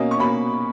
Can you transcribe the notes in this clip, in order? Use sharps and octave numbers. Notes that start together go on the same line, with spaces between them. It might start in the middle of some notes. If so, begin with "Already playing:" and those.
Already playing: B2 A#3 C#4 D#5
C#6
B2 A#3 C#4 B5